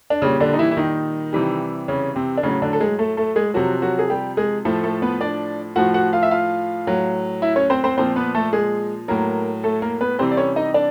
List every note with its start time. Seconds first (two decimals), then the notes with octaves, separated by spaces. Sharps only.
0.10 D4
0.22 A#2 C#3 G3 C#4
0.40 D3 D4
0.53 D#4
0.59 E3 E4
0.71 E4
0.77 D#3 D#4
1.33 C3 E3 G3
1.88 C#3 C#4
2.16 C3 C4
2.37 D4
2.43 A2 C#3 F#3 C#4
2.62 D3 D4
2.73 A4
2.80 G#3 G#4
2.99 A3 A4
3.17 A3 A4
3.36 G#3 G#4
3.54 C3 F3 F#3 F#4
3.82 F#3 F#4
3.99 G#4
4.10 G3 G4
4.37 G#3 G#4
4.65 A2 F3 A3 A4
4.83 A3 A4
5.02 B3 B4
5.21 D4 D5
5.76 A2 F3 F#4 F#5
5.94 F#4 F#5
6.13 F4 F5
6.23 E5
6.31 F4 F5
6.87 A2 F#3
7.42 E4 E5
7.56 C#4 C#5
7.70 C4 C5
7.84 C4 C5
7.98 A#2 F3 C4 C5
8.16 B3 B4
8.35 A3 A4
8.53 G#3 G#4
9.08 A2 F#3 A#3 A#4
9.64 A3 A4
9.82 A#3 A#4
10.01 B3 B4
10.19 C3 E3 G3 C4 C5
10.31 D5
10.37 C#4 C#5
10.56 D#4 D#5
10.74 D4 D5